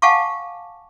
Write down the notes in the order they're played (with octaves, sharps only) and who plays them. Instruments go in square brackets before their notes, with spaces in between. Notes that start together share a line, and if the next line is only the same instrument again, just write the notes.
[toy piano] F5 F#5 G#5 A5 C#6 D6